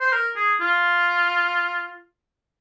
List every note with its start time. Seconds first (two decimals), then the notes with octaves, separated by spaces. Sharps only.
0.01 C5
0.12 A#4
0.36 G#4
0.61 F4